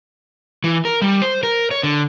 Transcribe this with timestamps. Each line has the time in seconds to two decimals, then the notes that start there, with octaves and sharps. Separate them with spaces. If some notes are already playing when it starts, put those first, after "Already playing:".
0.64 E3
0.85 A#4
1.02 G3
1.22 C5
1.43 A#4
1.71 C#5
1.83 D3